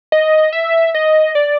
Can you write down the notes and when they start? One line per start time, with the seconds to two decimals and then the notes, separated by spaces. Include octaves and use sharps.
0.12 D#5
0.53 E5
0.94 D#5
1.35 D5